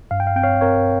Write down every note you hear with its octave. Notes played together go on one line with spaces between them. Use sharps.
G2 F5
G5
F5
C4 G5
C#5 F5
C4 A#4 C#5